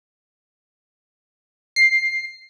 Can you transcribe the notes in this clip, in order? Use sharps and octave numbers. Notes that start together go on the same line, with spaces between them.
C7